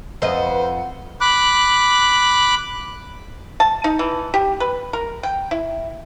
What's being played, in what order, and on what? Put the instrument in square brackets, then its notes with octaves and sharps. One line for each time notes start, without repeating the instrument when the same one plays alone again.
[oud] F2 D#5 [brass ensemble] B4 [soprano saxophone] C5 [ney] F#5
[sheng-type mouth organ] B5 D6 F#6
[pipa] A5
D#4
E3
G4
B4
A#4
G5
E4